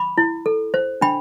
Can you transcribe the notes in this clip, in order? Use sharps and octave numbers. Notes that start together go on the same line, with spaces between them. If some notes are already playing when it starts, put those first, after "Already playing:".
Already playing: B5 D6
E4
A4
C5
D4 G5 B5